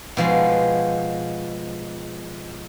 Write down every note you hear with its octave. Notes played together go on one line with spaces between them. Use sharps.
B2 F3 G#3